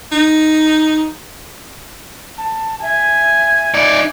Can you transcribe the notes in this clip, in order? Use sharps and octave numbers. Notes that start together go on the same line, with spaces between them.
D#4
A5
E5 G#5
D#4 D5